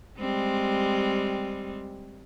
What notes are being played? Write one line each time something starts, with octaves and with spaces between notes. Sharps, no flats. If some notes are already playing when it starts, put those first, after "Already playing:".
G3 G#3 C4